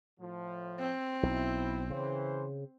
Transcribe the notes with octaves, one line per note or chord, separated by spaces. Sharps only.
A2 F3
C4
B1 E4
C#3 E3 C5